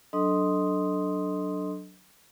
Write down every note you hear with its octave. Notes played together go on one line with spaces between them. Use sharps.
F#3 D4 A4 D#5 C6 D#6